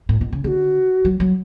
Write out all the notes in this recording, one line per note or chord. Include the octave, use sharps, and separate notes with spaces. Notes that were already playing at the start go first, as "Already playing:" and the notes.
A2
B2
C#3
D3 F#4 G#4
F#3
F#3